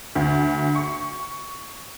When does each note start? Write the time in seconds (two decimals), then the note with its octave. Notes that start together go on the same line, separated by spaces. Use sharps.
0.15 D2
0.75 C#6